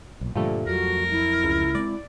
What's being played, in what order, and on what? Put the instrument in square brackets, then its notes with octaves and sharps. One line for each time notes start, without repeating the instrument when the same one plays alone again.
[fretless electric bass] B1 A#2
[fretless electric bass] G2 A#2 D3 [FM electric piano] F3 G3 A3
[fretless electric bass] F2 F#3 [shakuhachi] F#4 [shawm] A#4
[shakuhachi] E4
[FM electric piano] C#2
[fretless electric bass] G#3 C4 [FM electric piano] D5